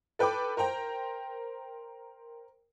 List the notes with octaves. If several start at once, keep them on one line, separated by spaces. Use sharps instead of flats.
A4 B4 G5 B5 D6
A#4 C5 G5 A#5